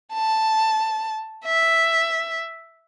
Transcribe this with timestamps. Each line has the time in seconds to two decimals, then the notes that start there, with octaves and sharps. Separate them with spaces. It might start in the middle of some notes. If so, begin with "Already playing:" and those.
0.14 A5
1.45 E5